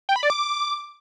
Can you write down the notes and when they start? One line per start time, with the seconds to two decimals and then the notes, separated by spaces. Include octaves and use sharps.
0.09 G5
0.16 B5
0.23 D5
0.30 D6